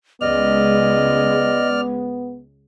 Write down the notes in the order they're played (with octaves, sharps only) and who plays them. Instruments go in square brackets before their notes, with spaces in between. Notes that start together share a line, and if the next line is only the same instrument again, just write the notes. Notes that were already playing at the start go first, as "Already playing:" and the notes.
[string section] C#2 G#3 [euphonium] B3 [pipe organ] D5 F6 [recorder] D#5